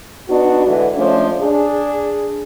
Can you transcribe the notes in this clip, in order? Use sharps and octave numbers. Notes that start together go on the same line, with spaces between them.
B3 D4 D#4 F#4
D3 E3 G#3 F#4 B4 D5
F3 G#3 A3 C#4 D4
D4 G#4